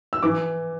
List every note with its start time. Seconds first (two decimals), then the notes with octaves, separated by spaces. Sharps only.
0.13 E6
0.23 E3 D6